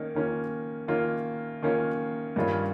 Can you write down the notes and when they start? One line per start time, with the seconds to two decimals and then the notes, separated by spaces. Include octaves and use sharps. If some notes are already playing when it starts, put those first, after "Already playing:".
Already playing: D#3 A#3 C#4
0.15 D#3 A#3 C#4 F4
0.88 D#3 A#3 C#4 F4
1.62 D#3 A#3 C#4 F4
2.36 G2 D#3 G3 C#4 F4